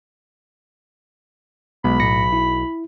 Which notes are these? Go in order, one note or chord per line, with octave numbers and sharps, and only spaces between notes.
B1 G#3 B3 B5
A2 A#6 C#7
E4